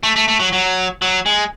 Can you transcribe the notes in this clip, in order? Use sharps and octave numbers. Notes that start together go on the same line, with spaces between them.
A3
A3
A3
F#3
F#3
F#3
G#3